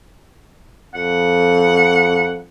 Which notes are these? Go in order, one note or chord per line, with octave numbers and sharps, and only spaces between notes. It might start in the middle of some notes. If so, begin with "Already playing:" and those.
F2 F#5